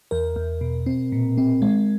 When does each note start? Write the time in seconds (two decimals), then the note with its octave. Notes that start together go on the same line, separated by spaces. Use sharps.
0.11 E2 A#4
0.36 E2
0.61 B2
0.86 C4
1.12 A#2
1.37 C4
1.62 G#3